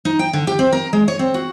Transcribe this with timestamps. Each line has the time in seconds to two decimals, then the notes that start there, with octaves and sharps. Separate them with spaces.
0.05 D#4
0.19 G5
0.33 D3
0.47 G4
0.59 C4
0.72 A#4
0.93 G#3
1.08 C#5
1.19 C4
1.34 F#4